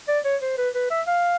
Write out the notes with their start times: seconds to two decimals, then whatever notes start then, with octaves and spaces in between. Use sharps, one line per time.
0.08 D5
0.25 C#5
0.41 C5
0.58 B4
0.74 B4
0.90 E5
1.07 F5